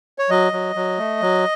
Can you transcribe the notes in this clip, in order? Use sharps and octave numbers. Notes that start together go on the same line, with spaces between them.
C#5
F#3 D#5
F#3
F#3
A3
F#3